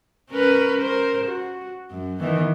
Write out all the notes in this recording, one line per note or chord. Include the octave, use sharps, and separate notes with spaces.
C#4 A#4 B4
A#4 C5
F#4
F#2
D#3 E3 B3